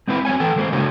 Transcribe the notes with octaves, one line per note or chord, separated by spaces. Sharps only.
G#3 C4 E4 B4
F#3 C4 C#5 G#5
E3 A4 B4 G5
D#3 G#3 A#3 G#4 C5
C#3 D4 F#4 A4 C#5